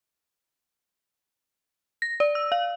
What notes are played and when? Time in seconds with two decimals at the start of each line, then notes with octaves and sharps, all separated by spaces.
2.02 A#6
2.20 D5
2.35 E6
2.52 F5